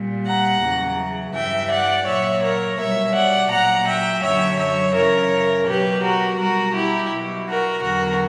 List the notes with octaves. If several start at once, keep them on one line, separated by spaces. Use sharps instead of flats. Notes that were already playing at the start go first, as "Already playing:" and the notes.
Already playing: A#2 G3
F#5 A#5
E2 C#3 F#3
G2 E3 G3 E5 G5
D5 F#5
A#2 F#3 C#5 E5
A#4 C#5
B2 G3 C#5 E5
D5 F#5
A#2 F#3 F#5 A#5
E5 G5
F#2 D3 F#3 C#5 E5
C#5 E5
F#2 C#3 E3 A#4 C#5
B2 F#3 G4 B4
F#4 A#4
B2 G3 F#4 A#4
E4 G4
B2 F#3
F#4 A#4
E2 D3 F#3 F#4 A#4